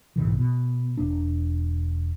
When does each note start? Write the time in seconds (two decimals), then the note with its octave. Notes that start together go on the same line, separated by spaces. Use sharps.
0.16 B1 G#2 C#3 E3
0.38 B2
0.97 E1 D4